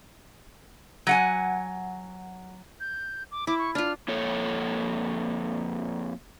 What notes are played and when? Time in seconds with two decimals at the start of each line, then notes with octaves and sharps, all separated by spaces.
1.07 F#3 F#5 G#5
2.80 G6
3.32 D6
3.47 E4 D6
3.59 C#6
3.75 D4 F4 F6
4.08 F2 A#3 A4 C#5